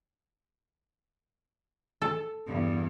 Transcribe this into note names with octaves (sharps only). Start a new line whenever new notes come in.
A4
E2 G2